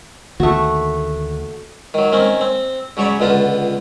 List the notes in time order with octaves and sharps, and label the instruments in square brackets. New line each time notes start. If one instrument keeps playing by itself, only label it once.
[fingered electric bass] D2 D#3 A#3 [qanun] A3 F#4
[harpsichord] D#3 F#3
D#3 A#3 C4 C#4
C4
C#3 F#3 C#5 D5 B5
C#2 D3 B3 F4 A5